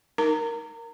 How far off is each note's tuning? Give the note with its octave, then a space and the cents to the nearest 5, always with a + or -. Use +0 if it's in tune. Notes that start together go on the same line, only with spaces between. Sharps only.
D#4 +0 A#4 +0 A#5 -30